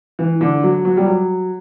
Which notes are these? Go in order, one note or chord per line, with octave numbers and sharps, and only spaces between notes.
E3
D3
F#3
F#3
G3
F#3